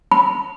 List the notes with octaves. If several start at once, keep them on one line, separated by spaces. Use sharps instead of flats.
B5